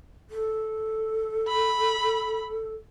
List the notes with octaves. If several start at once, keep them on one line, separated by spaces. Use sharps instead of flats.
A4
B5